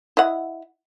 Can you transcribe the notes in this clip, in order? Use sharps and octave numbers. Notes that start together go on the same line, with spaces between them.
E4 D#5 F#5